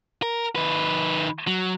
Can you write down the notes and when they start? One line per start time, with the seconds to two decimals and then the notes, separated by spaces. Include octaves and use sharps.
0.22 A#4
0.56 D#3 B4
1.47 F#3